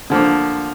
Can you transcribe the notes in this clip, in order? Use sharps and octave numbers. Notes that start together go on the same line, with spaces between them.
D3 F3 A#3